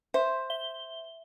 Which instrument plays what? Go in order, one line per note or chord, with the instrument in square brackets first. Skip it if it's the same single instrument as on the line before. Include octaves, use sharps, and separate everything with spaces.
[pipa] C5 [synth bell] E5
[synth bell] E5 G7